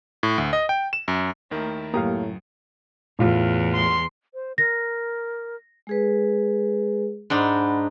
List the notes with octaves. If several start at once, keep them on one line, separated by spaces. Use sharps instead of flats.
A2
D2
D#5
G5
E7
F#2
D#2 D#3 A3 E4 A#4
C#2 F#2 A2 A#3 G4 F5 A#5 D#6
E2 A2 F4
C6
C5
A#4 A#6
G#3 G#4 B4
G#2 D4 D#4 F#5 B5